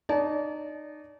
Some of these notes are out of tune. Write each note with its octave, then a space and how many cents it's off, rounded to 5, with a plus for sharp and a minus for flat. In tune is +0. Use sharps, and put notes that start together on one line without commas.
D#4 -30 D5 -35 A5 -35